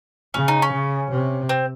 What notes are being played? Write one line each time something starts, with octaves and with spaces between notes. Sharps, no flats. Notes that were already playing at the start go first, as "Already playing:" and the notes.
C#3 C#4
D#4
C#4
C#3
C3
C4